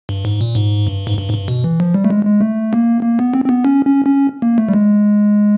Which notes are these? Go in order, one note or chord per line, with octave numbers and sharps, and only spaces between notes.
G2
G#2
A#2
G#2
G2
G#2
G2
G#2
G2
B2
E3
F3
G3
A3
G#3
G#3
A3
A#3
A#3
B3
C4
C4
B3
C#4
C#4
C#4
A#3
A3
G3
G#3